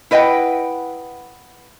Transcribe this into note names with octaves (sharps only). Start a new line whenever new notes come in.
E4 B4 D#5 F#5 G5